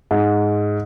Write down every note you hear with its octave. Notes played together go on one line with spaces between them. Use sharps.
G#2